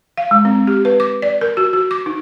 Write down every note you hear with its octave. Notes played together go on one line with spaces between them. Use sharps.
F5
G#3
C4
G4
B4
D6
D5
A#4
F#4
F#4
D6
D#4